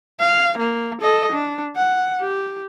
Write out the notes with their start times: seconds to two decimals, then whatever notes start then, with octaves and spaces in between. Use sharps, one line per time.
0.20 F5
0.58 A#3
1.01 A4 D#5
1.32 D4
1.76 F#5
2.21 G4